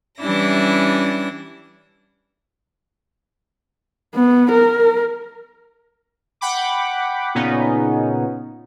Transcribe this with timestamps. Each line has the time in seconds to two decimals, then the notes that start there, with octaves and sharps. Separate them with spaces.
0.20 E3 G3 C#4 D4 E4 A#6
4.15 B3
4.51 A#4
6.41 F#5 G5 B5 D6
7.35 A#2 C#3 B3 C#4 D#4